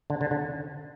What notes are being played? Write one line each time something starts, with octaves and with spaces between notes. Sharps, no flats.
D3
D3
D3